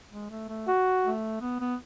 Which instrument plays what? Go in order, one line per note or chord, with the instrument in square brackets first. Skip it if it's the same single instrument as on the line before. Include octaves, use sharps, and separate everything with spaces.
[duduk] G#3
A3
A3
[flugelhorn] F#4
[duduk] A3
B3
B3